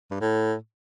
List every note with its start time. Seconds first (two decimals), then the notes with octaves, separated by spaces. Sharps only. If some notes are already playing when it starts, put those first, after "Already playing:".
0.11 G2
0.21 A2